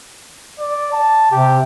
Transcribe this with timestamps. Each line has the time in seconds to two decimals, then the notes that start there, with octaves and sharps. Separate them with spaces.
0.60 D5
0.92 A5
1.32 C3 G4